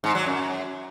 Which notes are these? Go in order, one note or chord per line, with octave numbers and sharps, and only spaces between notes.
G#2
F#3
F#2